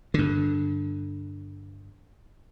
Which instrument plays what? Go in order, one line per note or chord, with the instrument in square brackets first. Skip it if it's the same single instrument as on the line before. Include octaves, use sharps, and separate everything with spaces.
[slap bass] G2 D3